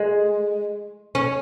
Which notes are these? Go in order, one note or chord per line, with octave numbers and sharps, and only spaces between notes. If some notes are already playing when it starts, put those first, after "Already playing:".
Already playing: G#3
C#4